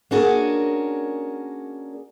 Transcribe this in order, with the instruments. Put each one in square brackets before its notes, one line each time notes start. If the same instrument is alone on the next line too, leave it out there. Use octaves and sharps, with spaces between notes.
[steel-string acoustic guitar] A#3 C#4 D4 F#4 G#4 A#4